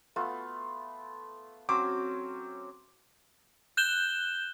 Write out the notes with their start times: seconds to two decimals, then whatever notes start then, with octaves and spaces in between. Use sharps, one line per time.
0.16 A3 B3 F4
1.69 F#3 C4 C#4 D6
3.77 F#6 G6 E7 G7